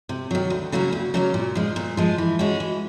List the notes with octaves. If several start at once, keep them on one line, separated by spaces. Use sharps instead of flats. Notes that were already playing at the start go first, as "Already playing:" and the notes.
C3
D#3 F#3
D2
C#3 F#3 A#3 C#4
D2
C#3 F#3 A#3 C#4
A#2
F3 G#3
A#2
F3 G#3
E3
G#3 C#4 F#4
E3